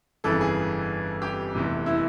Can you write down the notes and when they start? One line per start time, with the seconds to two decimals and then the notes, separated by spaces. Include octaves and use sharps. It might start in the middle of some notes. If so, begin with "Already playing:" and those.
0.24 G1 F2 C#3 E3 A4
0.41 G#4
1.22 G4
1.55 F1 E2 C3 E3
1.86 E4